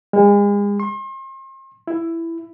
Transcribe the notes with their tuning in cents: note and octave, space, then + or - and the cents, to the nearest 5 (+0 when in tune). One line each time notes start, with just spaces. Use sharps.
G#3 -35
C6 +40
E4 +10